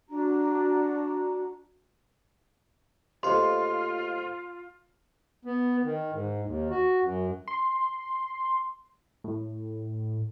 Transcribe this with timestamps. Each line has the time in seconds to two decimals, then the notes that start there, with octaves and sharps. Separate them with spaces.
0.09 D4 F#4 A#5
3.23 D#2 A3 F4 C5 F5 C6
5.45 B3
5.84 D#3
6.12 G#2
6.44 D#2
6.70 F#4
7.02 F#2
7.48 C6
9.24 A2